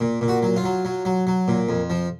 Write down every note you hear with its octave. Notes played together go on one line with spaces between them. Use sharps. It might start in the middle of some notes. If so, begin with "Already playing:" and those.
A#2
A#2
F#4
F#3
F4
F#3
F#3
F#3
F#3
A#2
F2
F3